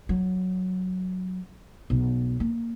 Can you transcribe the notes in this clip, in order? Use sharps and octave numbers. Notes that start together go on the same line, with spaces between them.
F#3
B1
A#3